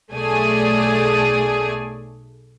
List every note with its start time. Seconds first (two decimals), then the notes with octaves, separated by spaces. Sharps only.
0.12 B1 A3 G#4 D5 G#5